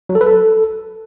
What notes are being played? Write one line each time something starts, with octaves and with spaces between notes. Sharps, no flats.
F#3
A4
B4
A4